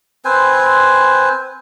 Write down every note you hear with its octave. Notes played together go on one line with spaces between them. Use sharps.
C4 B4 C5 G#5